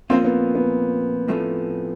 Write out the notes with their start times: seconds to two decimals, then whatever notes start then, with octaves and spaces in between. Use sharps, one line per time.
0.10 A#2 F3 A#3 C4 C#4 F4
0.25 B3
0.55 B3
1.28 A2 F3 A3 C#4